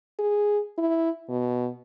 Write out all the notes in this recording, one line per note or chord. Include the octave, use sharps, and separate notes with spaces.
G#4
E4
B2